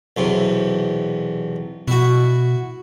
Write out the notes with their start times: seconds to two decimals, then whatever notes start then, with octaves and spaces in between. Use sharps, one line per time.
0.17 B1 E2 C3
1.88 B2 E4 F#4